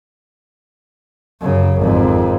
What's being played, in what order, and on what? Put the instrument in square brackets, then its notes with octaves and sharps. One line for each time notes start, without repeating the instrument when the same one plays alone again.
[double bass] F#2 C#3
G#1 F2